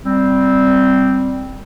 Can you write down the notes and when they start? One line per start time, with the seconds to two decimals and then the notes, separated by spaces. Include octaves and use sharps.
0.06 G3 C4